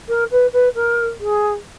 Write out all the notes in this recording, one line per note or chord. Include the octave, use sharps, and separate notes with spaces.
A#4
B4
B4
A#4
G#4